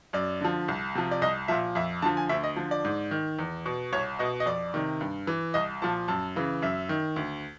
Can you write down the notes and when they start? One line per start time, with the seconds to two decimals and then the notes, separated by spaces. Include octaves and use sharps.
0.13 F#2 D5
0.41 D3 F3
0.68 C2
0.95 C3 F3
1.11 D5
1.22 C2 D#5
1.48 A#2 F3 E5
1.75 F2 E5
2.02 D3 F3 A5
2.17 G#5
2.29 D2 E5
2.44 D#5
2.56 D3 F3
2.71 D5
2.85 G#2
3.11 D#3
3.39 E2
3.66 B2
3.93 C2 C#5
4.19 B2 D#5
4.40 D#5
4.46 F2 D5
4.74 C3 D#3
5.01 G2
5.27 E3
5.54 C2 D#5
5.82 A#2 F3 A5
6.08 F#2 A5
6.36 C#3 E3
6.62 F#2 E5
6.89 D#3
7.16 D2